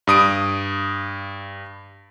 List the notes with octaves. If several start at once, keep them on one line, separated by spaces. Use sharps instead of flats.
G2 D#6 D7